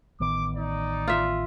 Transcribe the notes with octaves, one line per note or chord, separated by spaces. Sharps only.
A1 D#3 B3 D6
D#4 D5
F4 E5